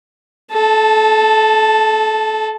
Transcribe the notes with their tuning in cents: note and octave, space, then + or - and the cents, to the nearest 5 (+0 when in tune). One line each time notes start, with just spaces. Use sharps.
A4 -30 A5 +0